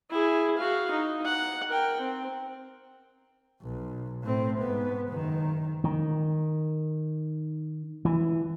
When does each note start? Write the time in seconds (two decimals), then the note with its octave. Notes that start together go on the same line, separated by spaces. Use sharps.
0.11 E4 G#4
0.57 F#4 F5
0.91 D#4
1.25 F#5
1.70 A#4 G5
2.00 C4
3.62 B1
4.23 A2 C4
4.59 G#2 B3
5.09 F#1 D#3
5.84 D#3
8.05 E3